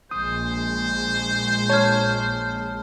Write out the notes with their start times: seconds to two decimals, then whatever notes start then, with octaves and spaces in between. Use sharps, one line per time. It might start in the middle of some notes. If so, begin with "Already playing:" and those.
0.11 A#1 G#3 C5 D#6
1.69 C#5 A5 F6 G#6